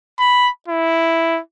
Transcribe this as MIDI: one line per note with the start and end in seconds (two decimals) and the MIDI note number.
0.19 0.50 83
0.68 1.40 64